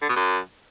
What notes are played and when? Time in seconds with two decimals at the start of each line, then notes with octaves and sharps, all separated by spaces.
0.02 D3
0.09 B2
0.16 F#2